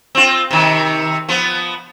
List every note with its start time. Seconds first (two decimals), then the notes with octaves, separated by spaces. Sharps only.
0.15 C4 F4
0.51 C3 D#3
1.29 F3 B3